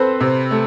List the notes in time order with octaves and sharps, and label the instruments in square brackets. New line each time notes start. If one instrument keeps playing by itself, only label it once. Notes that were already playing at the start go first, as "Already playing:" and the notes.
Already playing: [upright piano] C4 [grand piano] A4 B4 C5
[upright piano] C3
A3